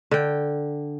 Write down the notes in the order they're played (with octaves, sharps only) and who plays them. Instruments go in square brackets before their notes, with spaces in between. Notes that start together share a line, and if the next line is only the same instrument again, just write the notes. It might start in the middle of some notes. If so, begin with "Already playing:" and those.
[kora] D3 G5